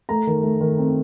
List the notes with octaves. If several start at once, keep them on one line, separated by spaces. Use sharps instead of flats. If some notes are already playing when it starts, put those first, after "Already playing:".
A3 A#5
D#3
A3
D#3
C4